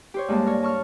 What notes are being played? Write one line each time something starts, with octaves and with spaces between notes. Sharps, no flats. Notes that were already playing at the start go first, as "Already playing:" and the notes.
G4 C5 C#5
G2 G#3 A#3 A5
A#4 C#5
A5 C#6 F6